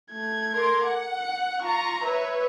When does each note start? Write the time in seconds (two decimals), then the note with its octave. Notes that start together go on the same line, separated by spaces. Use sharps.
0.12 A3 G#6
0.53 A#4 C6 D6
0.85 F#5
1.17 F#6
1.62 F4 A#5 C#6
2.04 B4 C#5 E5